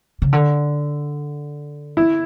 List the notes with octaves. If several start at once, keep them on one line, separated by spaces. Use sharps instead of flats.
C#3
D3
E4